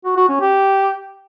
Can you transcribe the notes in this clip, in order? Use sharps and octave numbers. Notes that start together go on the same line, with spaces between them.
F#4
F#4
C#4
G4